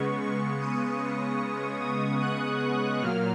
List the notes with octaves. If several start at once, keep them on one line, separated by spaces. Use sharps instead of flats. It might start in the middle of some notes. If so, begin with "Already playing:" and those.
Already playing: C#3 G#3 B3 C#6
C#6
D#6
D#6
F#6
A#2 F#3 A#3 F6